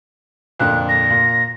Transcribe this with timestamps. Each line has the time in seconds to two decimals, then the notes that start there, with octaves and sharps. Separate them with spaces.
0.60 F2 A#2 D3 F#6
0.88 A#6
1.10 A#2